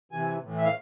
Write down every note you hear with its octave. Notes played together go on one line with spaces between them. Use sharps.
C3 E3 G#5
A2 E3
E5
F5